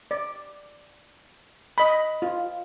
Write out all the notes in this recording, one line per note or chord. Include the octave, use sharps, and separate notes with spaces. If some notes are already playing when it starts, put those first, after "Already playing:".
D5
D#5 B5
F4